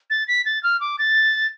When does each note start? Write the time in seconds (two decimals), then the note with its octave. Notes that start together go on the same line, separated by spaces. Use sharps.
0.10 A6
0.28 B6
0.45 A6
0.63 F6
0.81 D6
0.99 A6